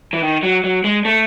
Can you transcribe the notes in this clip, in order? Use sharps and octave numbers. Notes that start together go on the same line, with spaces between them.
E3
D#3
F#3
F#3
G#3
A3